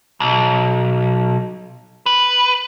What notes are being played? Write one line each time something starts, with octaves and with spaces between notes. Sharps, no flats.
B1
B4